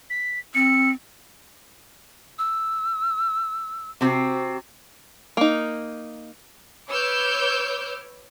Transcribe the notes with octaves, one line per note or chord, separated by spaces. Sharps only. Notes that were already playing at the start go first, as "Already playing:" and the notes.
B6
C4 C#7
E6
C3 C4 F#4
A#3 D#4
B4 C#5 D6 E6 F6 G6